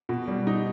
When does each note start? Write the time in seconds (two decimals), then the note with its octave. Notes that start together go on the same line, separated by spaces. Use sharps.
0.09 B2
0.28 G3
0.47 D#4